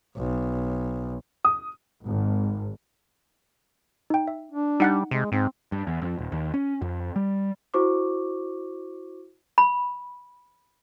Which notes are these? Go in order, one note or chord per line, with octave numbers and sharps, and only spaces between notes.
B1
D#6
G#1
D#4 G5
E5
D4
G3 D#4 F#5 F#6
C3 G#3
G#2 C4
G2
E2
F2
D#1
D#2
C#4
F2
G3
E4 F#4 C5 C#6 D6
B5